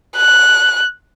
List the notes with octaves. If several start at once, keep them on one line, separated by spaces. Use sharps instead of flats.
F#6